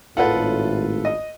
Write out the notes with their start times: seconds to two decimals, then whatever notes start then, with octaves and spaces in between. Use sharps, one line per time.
0.17 G#1 A2 F4 A4 B4 F#5
1.05 D#5